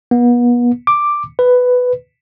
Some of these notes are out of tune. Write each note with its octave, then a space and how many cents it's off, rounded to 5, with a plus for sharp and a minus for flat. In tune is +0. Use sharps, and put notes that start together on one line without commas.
B3 -35
D6 +5
B4 +10